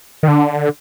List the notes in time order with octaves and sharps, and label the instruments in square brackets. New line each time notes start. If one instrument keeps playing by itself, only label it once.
[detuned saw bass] D#3
D3